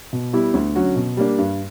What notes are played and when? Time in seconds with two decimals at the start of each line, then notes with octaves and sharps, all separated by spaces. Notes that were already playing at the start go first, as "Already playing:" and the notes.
0.13 B2
0.33 G3 B3 E4 G4
0.54 D2
0.75 D3 F#3 C#4 F#4
0.96 B2
1.17 G3 A#3 D4
1.38 G2